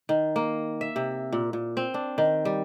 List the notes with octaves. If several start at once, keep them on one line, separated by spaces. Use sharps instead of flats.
D#3
A#3
E5
C3
A#2
A#2
C4
D4
D#3
G3